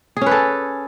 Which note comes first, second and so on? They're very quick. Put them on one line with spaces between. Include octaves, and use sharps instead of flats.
G#4 C#4 B4 A4